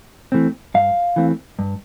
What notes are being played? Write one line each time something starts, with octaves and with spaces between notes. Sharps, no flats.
E3 A3 C4
G2 F5
E3 A3 C4
G2